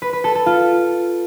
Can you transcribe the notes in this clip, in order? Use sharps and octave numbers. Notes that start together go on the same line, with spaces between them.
B4
B4
A4
A4
F4